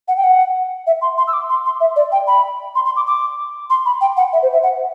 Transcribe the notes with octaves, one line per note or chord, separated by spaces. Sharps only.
F#5
G5
F#5
E5
C6
C6
E6
D6
C6
C6
E5
D5
G5
B5
C6
C6
D6
D6
C6
B5
G5
F#5
E5
C5
E5
F#5